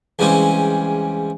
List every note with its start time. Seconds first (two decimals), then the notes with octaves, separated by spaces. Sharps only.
0.19 E2 C#3 G3 G#3 C4 C#4